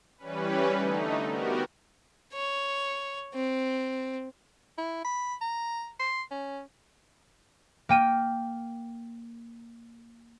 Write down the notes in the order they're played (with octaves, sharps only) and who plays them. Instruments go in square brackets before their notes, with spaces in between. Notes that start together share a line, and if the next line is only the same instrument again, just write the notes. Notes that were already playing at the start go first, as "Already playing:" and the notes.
[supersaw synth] E3 G3 C#4 B4
D3 A3 D#4
B3 F#4 G4 A#4
[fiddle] C#5
C4
[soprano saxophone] E4
B5
A#5
C6
C#4
[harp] A#3 G5 D#7